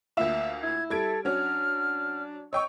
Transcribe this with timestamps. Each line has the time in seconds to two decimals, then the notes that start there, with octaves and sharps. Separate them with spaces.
0.17 D2 A#3 F4 E5
0.63 E4 G#6
0.90 G3 A4 G#6 D7
1.25 F#3 C#4 D4 F6
2.53 C#5 D#5 G5 C#6 E6